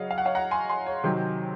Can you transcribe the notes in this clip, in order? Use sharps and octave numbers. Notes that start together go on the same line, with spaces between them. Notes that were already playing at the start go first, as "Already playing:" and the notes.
Already playing: C#3 F#3 C#5 D#5 F5 F#5
F5
F#5
C#5 F5
F#5 A#5
G#5 C6
G#5 C6
C#5
C3 D#3 F#3 C5